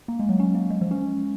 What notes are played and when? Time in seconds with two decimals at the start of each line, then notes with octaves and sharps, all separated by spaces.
0.08 A#3
0.19 G#3
0.29 F#3
0.40 C#4
0.55 A#3
0.70 G#3
0.81 F3
0.91 C#4